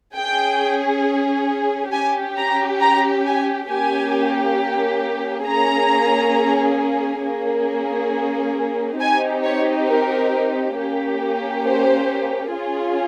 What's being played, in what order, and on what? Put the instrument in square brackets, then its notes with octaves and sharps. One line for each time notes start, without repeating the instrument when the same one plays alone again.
[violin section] C#4 G#4 G5
C#4 G4 G#5
A#5
A#5
G#5
A#3 C#4 G4 G#5
A#3 C#4 G#4 A#5
A#3 C#4 G#4
C4 D#4 G4 G#5
C#5
A#4
A#3 C#4 G4
C5
C#4 F4 G#4